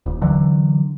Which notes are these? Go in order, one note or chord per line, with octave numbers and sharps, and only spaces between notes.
D#1
D3 E3 F#3